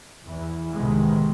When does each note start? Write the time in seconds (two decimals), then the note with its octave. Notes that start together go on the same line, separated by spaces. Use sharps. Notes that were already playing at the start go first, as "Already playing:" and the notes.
0.25 E2 E3
0.73 C2 A2 C3 D#3 G#3 B3